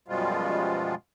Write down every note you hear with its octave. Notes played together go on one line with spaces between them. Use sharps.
F#2 B2 F3 G3 G#3 F4